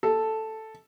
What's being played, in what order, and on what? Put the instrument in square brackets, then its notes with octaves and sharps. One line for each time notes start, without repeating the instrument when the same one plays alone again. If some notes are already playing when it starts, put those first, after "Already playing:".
[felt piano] A4